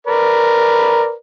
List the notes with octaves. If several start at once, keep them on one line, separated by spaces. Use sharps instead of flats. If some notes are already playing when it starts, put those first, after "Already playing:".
A#4 B4 D5